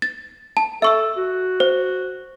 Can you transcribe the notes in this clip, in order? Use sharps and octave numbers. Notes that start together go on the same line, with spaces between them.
A6
A5
A4 E5 C#6 E6
F#4
C5